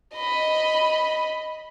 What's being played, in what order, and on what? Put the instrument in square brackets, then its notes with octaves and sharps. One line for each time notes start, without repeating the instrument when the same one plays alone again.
[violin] D#5 B5